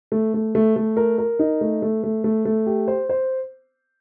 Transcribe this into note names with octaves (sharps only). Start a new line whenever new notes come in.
A3
A3
A3
A3
A#4
A#4
D#4
A3
A3
A3
A3
A3
G4
C5
C5